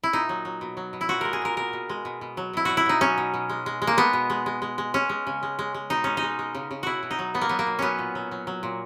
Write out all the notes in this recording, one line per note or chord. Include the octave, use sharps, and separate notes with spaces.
E4
A#2 D#4
F#3
F#3
B2
F#3
B2
E4
A#2 F#4
G#3 A#4
G#4
A#2 A#4
B2 A#4
B2
G#3
B2
B2
F#3
B2 E4
B2 F#4
E4
B2 D#4
F#3 C#4
B2
B2
G#3
G#3
G#3
A#3
G#3 B3
B2
G#3
G#3
G#3
G#3
G#3 C#4
G#3
C#3
G#3
G#3
G#3
B2 D#4
G#3 C#4
D#4
G#3
G#3
C#3
C#3
B2 E4 F#4
B2
D#4
F#3
F#3 B3
A#3
F#3 B3
A#3
B2
F#3 B3 C#4
A#2
F#3
F#3
F#3
A#2